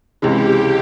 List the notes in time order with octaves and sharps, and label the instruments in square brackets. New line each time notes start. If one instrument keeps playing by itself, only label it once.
[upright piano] C#2 C3 E3 G#3 [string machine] G4